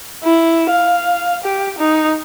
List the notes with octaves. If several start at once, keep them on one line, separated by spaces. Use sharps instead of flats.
E4
F5
G4
D#4